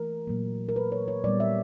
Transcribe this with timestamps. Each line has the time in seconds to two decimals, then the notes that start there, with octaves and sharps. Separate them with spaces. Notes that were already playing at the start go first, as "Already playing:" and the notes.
Already playing: E3 A3 A#4
0.27 A#2 F#3 A#3
0.69 A#4
0.76 B4
0.92 C#5
1.08 C#5
1.24 A#2 G3 B3 D5
1.40 E5